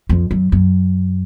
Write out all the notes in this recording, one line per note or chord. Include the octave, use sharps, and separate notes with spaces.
F2
F#2
F#2